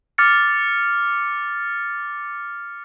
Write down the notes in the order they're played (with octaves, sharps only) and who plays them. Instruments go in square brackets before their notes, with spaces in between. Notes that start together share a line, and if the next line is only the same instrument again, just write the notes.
[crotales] D6 F6 A6 C#7